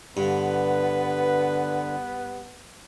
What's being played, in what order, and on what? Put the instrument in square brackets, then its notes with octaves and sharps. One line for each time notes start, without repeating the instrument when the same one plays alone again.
[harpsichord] G2 [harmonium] D3 [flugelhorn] B3 [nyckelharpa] B4